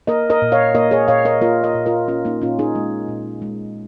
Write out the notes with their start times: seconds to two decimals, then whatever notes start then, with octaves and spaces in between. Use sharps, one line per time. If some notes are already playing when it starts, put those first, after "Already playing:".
0.07 A#3 A#4 D#5
0.30 A#4 D#5
0.42 A#2
0.52 C#5 F5
0.75 A#3 A#4 D#5
0.91 G#4 C#5
1.08 A#2 C#5 F5
1.25 A#4 D#5
1.41 A#3 F4 A#4
1.64 A#4 D#5
1.75 A#2
1.86 F4 A#4
2.08 A#3 C#4 F4
2.25 A#3 D#4
2.42 A#2 C#4 F4
2.59 D#4 G#4
2.75 G#3
3.08 A#2
3.42 G#3